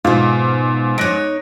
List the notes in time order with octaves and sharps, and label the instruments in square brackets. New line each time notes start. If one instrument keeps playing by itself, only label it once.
[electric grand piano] G#2 [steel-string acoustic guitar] B2 E5 [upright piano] F4
[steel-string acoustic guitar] D#4 C#5 [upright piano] F#6 A#6 D7